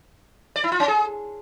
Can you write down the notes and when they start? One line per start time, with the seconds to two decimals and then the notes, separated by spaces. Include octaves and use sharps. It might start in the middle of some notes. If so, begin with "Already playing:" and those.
0.56 D5
0.64 E4
0.72 F4
0.80 C#4
0.88 G#4